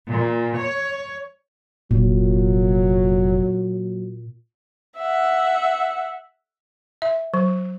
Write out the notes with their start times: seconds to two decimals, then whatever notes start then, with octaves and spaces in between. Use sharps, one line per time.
0.10 A#2
0.58 C#5
1.91 F1 A#2 F#3
4.98 E5 F#5
7.02 E5
7.34 F#3